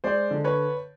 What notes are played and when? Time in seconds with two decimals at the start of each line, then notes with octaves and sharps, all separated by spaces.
0.04 G#3 C5 D5
0.31 D3
0.44 B4 C#5